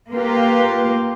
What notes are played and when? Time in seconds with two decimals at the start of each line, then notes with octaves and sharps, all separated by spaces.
0.11 A#3 F4 G4 B4